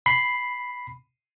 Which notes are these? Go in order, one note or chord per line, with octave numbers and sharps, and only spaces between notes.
B5 C7